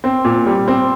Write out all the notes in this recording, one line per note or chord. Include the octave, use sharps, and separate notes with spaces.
C4
A#2
G3
C4